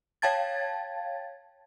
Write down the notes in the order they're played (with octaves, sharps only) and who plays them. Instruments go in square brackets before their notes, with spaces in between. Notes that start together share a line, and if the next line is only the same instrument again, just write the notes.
[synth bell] C#5 F5 G5 A5 G#6 A6